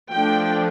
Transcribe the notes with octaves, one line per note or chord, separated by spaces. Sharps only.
F3 A3 D4 G5